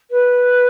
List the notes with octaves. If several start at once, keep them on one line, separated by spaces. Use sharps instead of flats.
B4